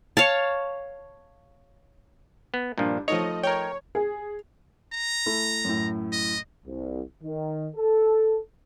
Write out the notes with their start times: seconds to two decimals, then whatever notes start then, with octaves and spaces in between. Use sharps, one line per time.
0.17 C#5 F5 A5
2.54 B3
2.78 G2 A#2 F3 D4
3.08 F3 A3 D#4 C#5 D#5
3.43 A#4 C#5 G5
3.95 G#4
4.93 A#5
5.26 A3 E4
5.65 F#2 A2
6.12 D#5
6.66 C2
7.23 D#3
7.76 A4